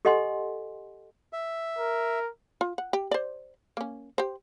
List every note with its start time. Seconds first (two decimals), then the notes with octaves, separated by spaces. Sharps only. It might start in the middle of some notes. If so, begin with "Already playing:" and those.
0.05 G4 A4 D#5 F#5 G#5 C6
1.33 E5
1.78 A#4
2.61 F4
2.78 F#5
2.93 G4
3.11 C5 D5
3.77 A#3 C#4
4.18 G4 C5